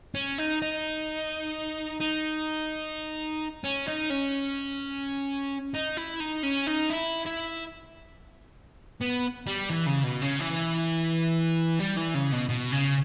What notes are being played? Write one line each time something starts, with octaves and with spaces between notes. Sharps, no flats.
C#4
D#4
D#4
D#4
C#4
D#4
C#4
D#4
E4
D#4
C#4
D#4
E4
E4
B3
G3
E3
C#3
B2
C#3
E3
G3
E3
C#3
B2
B2
C#3